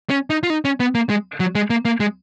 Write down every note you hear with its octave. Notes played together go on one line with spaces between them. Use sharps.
C#4
D#4
F4
D#4
C#4
B3
A#3
G#3
F#3
G#3
A#3
A#3
G#3